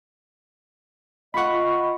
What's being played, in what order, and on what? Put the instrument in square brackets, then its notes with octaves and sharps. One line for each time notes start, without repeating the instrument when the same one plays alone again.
[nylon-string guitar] F4 F#5 [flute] D#5 [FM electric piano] B5 C#6